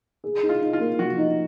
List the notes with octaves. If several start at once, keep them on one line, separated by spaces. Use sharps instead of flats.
G#4
D#4
F4
D#4
F4
A#3
F3 F#4
D#4